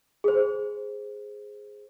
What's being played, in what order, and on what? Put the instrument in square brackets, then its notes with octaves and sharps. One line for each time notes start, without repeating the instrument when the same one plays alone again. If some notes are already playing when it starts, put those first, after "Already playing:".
[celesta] G#4 C5